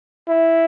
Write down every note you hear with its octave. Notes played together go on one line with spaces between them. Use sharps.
E4